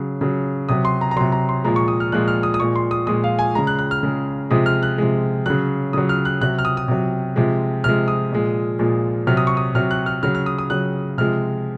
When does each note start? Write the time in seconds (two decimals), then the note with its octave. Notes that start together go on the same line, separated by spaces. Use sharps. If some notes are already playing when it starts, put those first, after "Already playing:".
Already playing: C#3 F#3
0.21 C#3 F#3
0.69 C3 F#3 D#6
0.85 C6
1.01 A#5
1.11 A#5
1.16 C3 F#3 C6
1.32 A#5
1.49 C6
1.64 A#2 F3 G#3 A#5
1.76 C#6
1.88 D#6
2.00 F6
2.12 A#2 F3 G#3 F#6
2.28 F6
2.43 D#6
2.54 D#6
2.60 A#2 F3 G#3 C#6
2.76 C6
2.91 D#6
3.07 A#2 F3 G#3 D#6
3.24 F5
3.39 G#5
3.55 C#3 G#3 A#5
3.67 F#6
3.79 F#6
3.91 F6
4.03 C#3 G#3
4.50 C3 F3 G#3 D#6
4.66 F6
4.83 F#6
4.98 C3 F3 G#3
5.46 C#3 F#3 F#6
5.93 C#3 F#3 D#6
6.09 F6
6.25 F#6
6.41 C3 F#3 F#6
6.59 F6
6.65 D#6
6.77 D#6
6.88 C3 F#3
7.36 C3 F3 G#3
7.84 C3 F3 G#3 F6
8.08 D#6
8.32 A#2 F3 G#3
8.79 A#2 F3 G#3
9.27 C3 F#3 F6
9.37 D#6
9.47 C#6
9.57 D#6
9.75 C3 F#3 F6
9.91 F#6
10.06 F6
10.23 C#3 F#3 F6
10.35 F6
10.46 D#6
10.58 D#6
10.70 C#3 F#3 F#6
11.18 C3 F3 G#3 F6